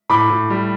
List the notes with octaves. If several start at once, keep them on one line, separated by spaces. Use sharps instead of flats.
A2 B5 D6
A2
G3